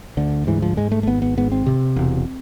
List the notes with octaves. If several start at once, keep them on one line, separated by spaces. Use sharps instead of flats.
D2 D3
G#2 E3
F3
G#2 G#3
A3
A3
G#1 B3
B3
G#2 B3
C4
C3
E1